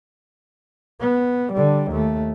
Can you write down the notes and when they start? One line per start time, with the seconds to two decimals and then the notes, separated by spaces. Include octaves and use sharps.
1.01 B3
1.53 D3 G3
1.92 D#2 A3